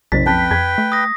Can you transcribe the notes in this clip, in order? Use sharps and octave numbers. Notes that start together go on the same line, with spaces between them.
F#1 B1 C5 A6 B6
F2 B4 G5 A5
F2 G#6
A3
D#6 A#6